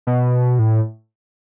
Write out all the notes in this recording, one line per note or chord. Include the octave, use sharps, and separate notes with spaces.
B2
A2